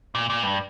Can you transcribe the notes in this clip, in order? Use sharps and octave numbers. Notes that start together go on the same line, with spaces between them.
A#2
A#2
G2